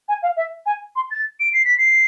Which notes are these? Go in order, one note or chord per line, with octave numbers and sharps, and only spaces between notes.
G#5
F5
E5
G#5
C6
A6
D7
C7
B6
C7